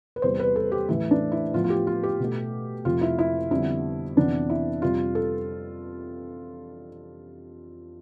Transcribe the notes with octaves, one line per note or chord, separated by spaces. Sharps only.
B4
E2 C3 G3 C5
B4
A4
G4
A2 E3 A3 E4
D4
E4
A2 F3 B3 F4
F4
G4
F4
G4
B2 A3
F2 C3 F3 A3 F4
E4
E4
F2 D3 G3 B3 E4
F2 C3 E3 B3 D4
E4
F2 C3 G3 F4
A4